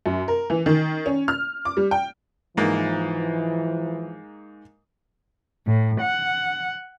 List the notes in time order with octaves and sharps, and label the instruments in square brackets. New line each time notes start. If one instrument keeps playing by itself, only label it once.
[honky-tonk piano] F#2
A#4
E3
D#3
C#4
F6
D6
G3
G5
[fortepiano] G#2 A#3 [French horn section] E3 F3
[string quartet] A2
F#5